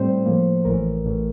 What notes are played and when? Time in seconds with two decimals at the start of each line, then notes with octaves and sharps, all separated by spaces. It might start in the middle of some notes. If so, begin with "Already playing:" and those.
Already playing: A2 G3 C4 C5
0.25 A2 F3 A#3
0.65 A1 A2 E3 A#4
1.03 A1 A2 E3